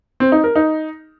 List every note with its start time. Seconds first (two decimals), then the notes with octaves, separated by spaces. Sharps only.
0.20 C4
0.32 D#4
0.44 A#4
0.56 D#4